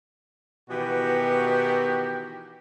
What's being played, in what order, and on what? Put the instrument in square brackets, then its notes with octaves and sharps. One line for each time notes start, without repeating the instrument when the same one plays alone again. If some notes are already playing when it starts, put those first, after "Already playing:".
[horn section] B2 D#3 E3 B3 F#4 G4